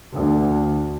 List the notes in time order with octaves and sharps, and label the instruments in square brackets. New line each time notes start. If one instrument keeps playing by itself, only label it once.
[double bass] D2